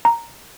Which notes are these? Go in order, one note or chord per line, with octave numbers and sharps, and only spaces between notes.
A#5